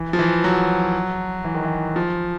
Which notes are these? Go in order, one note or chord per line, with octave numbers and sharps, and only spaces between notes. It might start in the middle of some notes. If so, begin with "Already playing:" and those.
Already playing: E3
F3
E3
F#3
E3
D#3
E3
F3